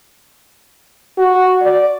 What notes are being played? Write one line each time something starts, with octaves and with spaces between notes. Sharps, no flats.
F#4
D5